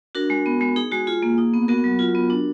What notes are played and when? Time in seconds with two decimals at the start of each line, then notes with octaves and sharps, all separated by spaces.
0.15 D4 F#4 A#4
0.30 G#3
0.46 B3
0.61 G#3
0.76 D#4 G#4
0.92 G#3 F#4
1.07 F4 G#4
1.23 A#3
1.38 D#4
1.54 B3
1.68 B3 F#4 A#4
1.84 F#3
1.99 F4
2.15 B3
2.30 D4